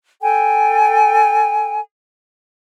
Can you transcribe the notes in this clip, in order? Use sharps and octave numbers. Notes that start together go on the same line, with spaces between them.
A4 G5 G#5